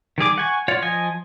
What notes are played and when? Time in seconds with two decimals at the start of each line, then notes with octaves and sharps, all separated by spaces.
0.18 D#3 G3 G#4 D6
0.38 F#5 G#5 C#6
0.68 F4 C#5 D5 F#5
0.82 F3 D#5 G#5